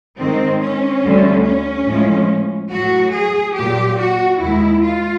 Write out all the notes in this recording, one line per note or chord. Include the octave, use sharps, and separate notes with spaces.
G#2 D#3 G#3 C4
C#4
D2 D3 G3
C#4
A2 F3 G#3
A2 F#3 F#4
G#4
A#2 F#3 G4
F#4
D#2 D#3 G#3 E4
F4